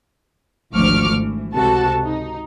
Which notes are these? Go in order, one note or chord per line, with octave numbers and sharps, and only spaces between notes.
G#1 D2 F3 C#6 D6 F6
E3
C#2 C3 F#4 A4 A5
D#4